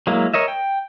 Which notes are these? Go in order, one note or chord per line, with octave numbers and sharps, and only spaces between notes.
F#3 G#3 A#3 E4
A#4 C#5 D#5 E5
G5